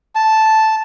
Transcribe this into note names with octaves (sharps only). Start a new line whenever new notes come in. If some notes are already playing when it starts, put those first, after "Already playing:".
A5